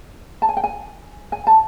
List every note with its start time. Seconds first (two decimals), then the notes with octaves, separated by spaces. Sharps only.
0.42 A5
0.49 G#5
0.57 G5
0.64 G#5
1.32 G#5
1.47 A5